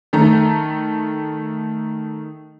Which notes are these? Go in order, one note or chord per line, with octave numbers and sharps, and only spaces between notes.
D#3 A3 A#5